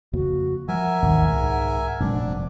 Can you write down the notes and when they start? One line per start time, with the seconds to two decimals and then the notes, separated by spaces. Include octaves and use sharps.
0.13 F2 C#3 A#3 F#4
0.68 F3 G3 A#4 E5 F#5 G#5
1.02 G#1 D#2 G#2 B2
1.28 C2 G#2
2.00 F1 F#2 A#2 G3 G#3 C4 D4